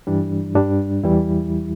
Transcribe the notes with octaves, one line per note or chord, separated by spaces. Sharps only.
G2 E3 G3 D4
G2 G3 D4
E2 E3 G3 E4